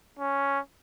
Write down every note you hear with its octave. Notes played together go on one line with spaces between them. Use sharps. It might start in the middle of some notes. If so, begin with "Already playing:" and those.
C#4